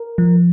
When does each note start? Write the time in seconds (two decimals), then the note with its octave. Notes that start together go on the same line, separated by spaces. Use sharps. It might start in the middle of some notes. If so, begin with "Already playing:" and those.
Already playing: A#4
0.18 F3